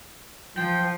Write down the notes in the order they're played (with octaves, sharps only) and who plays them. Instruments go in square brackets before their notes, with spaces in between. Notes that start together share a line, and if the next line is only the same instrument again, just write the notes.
[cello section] F3 [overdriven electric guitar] G5